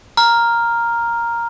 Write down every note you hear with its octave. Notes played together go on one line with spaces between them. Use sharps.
A#5 F6